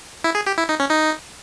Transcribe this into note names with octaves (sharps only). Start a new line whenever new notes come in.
E4
G#4
G4
E4
D#4
C#4
D#4